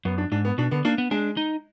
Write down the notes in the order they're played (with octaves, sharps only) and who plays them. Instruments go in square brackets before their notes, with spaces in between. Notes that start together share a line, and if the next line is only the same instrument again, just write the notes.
[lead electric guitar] F#2 [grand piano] B3
[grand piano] D4
[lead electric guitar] G#2 [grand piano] D4
[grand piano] B3
[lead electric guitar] B2 [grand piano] D4
[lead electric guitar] D3 [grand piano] B3
[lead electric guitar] A#3 [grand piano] D4
[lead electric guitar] B3
[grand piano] G#3 [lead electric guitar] D4
[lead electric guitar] D#4